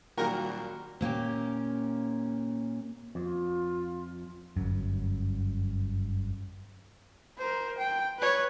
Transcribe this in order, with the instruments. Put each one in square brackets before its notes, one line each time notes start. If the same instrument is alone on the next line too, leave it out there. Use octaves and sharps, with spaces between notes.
[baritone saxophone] A#2 [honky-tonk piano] D#3 F#3 G3 [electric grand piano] F#4 F5 G5 [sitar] A#4
[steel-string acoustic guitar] A#2 A#3 C#4 G4
[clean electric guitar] F2 [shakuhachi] F4
[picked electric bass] G1 F#2
[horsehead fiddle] A#4 C5
G5
B4 C#5